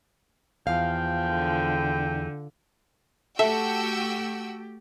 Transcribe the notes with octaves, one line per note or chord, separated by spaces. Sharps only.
E2 F3 F5 G5
D3
A3 F#4 G4 A4 E5 G5 E6